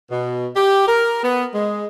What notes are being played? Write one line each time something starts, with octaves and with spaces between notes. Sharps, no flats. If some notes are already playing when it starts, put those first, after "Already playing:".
B2
G4
A#4
B3
G#3